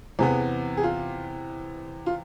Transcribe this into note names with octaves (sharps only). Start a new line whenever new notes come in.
E2 C3 E3 B3 G#4
G#4
F4
F4